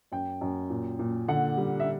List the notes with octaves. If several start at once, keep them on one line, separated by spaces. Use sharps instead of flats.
F#2 G5
F#2
A#2
A#2
D3 F#5
G3
E5